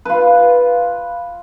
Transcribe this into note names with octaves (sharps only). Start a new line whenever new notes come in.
F4 B4